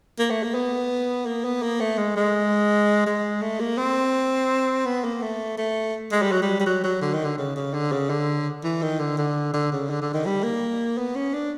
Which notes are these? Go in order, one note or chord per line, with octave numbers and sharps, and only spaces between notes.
A#3
A3
A#3
B3
A#3
B3
A#3
A3
G#3
G#3
G#3
A3
A#3
C4
B3
A#3
A3
A3
G#3
G3
F#3
G3
G3
F#3
F#3
D3
D#3
D3
C#3
C#3
D3
C#3
D3
E3
D#3
D3
D3
D3
C#3
D3
D3
D#3
G3
A#3
B3
C#4
D4